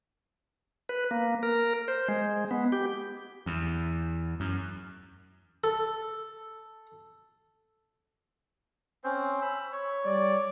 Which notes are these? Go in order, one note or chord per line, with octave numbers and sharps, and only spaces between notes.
B4
A#3
A#4
C5
G#3
B3
G4
E2
F#2
A4
C4 C#4 C5
B5 E6
C#5
G3 D5